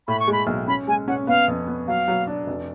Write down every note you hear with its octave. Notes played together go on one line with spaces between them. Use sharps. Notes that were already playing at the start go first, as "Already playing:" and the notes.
A2 B5
C#6
G#3 B5
B1
C#4 B5
G#3 G#5
C#4 F#5
B3 F5
F2
B3
F#3 F5
F#3
D4
F1